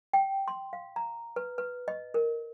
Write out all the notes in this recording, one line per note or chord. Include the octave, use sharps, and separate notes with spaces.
G5
C6
F5
A#5
B4
B4
D#5
A#4